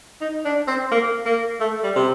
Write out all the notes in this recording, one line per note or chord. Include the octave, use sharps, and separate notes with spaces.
D#4
D4
C4
A#3
A#3
A3
G3
C3